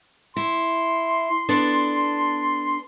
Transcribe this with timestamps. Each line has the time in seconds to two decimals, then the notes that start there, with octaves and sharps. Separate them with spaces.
0.36 E4 C6
1.49 B3 D4 A4